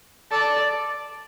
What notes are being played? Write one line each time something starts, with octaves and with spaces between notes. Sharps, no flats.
A4 D5